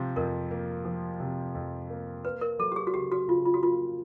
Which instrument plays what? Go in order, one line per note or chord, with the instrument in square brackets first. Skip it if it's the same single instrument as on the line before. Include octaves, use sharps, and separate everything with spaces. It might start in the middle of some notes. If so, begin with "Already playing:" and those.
Already playing: [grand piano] C3 F3
[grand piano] F2 [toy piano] A#4
[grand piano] A#3
F3
C3
F2
A#3
[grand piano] A#3 [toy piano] B4
[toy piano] A#4
[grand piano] F#3 [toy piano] A4
[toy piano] G4
G#4
F#4
[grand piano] C#3 [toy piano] G4
[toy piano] F#4
[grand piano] C#3 [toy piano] F4
[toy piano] F4
F#4
[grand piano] A#3 [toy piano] F4